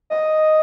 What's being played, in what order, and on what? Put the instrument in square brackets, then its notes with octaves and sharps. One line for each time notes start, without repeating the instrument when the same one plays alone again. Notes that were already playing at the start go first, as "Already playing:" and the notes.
[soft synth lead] D#5